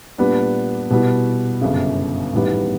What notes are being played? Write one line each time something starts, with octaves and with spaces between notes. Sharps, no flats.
A#2 G3 B3 D4
B2 G3 B3 E4
G1 F#2 C#3
A1 G#2 D#3 G3 B3